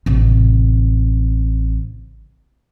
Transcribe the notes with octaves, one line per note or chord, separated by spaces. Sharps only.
A1 C3